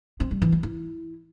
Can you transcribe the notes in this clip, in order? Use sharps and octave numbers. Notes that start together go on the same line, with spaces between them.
C4
G3
E3
E4
E4